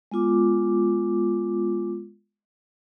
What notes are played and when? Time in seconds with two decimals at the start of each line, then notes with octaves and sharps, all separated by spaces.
0.11 G#3 B3 F4 D6